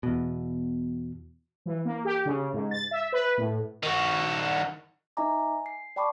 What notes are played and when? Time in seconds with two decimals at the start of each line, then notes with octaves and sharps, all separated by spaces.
0.03 E2 B2
1.66 E3
1.85 A#3
2.05 G4
2.25 C#3
2.53 G#2
2.71 A6
2.91 E5
3.12 B4
3.37 A2
3.83 D#3 F#4
5.17 D#4 D#5 E5 G#5 A#5 D6
5.40 G#5
5.66 C7
5.96 D5 G5 A5 B5 C#6 D6